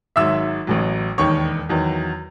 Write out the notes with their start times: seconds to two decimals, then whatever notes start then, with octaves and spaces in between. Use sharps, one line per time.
0.16 G#1 G#2 F#3 E5 E6
0.67 A1 A2 F#3
1.18 E1 D#2 D#3 C#5 C#6
1.69 E2 D#3 F#3